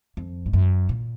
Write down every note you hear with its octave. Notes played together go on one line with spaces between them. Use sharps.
F2
G#2
F#2
A#2